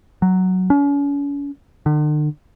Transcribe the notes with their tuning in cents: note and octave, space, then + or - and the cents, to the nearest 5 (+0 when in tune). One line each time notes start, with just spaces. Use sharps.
F#3 +5
C#4 +40
D3 +45